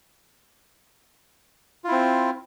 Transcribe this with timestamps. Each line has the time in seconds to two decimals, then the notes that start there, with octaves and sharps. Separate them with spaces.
1.84 F4
1.88 E4
1.92 C4